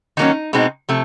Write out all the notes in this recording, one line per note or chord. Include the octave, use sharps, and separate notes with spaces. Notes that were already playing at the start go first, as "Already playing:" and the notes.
D#3 F#3 A#3 C#4 D#4
B2 G#3 C4 D#4
C3 F3 A3